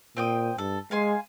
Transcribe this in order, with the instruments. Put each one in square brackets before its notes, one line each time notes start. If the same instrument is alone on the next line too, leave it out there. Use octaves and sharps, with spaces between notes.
[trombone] A#2 [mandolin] C4 G5 D#6
[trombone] G2 [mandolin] A4
[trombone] G#3 [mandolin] F5 G#5 C6